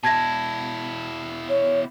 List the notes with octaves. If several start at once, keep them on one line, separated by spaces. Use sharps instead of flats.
B2 E4 A5 G#6 A#6
C#5